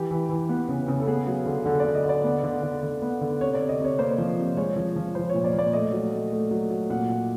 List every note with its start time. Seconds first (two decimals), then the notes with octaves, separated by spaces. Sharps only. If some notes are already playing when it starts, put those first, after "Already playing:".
Already playing: E3 G4
0.11 E3
0.29 E3
0.49 B3
0.68 C#3
0.88 C#3
1.00 A4
1.07 B3 G#4
1.27 F#3
1.46 D3
1.66 D3 A4
1.80 D5
1.85 D3
1.95 D#5
2.05 D3 D5
2.24 B3
2.43 D3
2.63 D3
2.83 D3
3.02 B3
3.21 D3
3.41 C3 C#5
3.54 D5
3.60 C3
3.69 D#5
3.80 C3 C#5
3.98 A#3 C5
4.18 F3
4.38 C3
4.57 G#3 C#5
4.76 F3
4.96 F3
5.15 F3 C5
5.30 C#5
5.34 A#2
5.44 D5
5.53 A#2
5.59 D5
5.73 A3 D#5
5.92 F#3
6.12 A3
6.32 A3
6.51 F#3
6.70 F#3
6.90 A#2 F#5
7.09 A#2